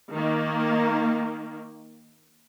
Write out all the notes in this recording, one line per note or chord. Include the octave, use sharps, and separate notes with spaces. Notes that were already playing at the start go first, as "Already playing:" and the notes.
D#3 A#3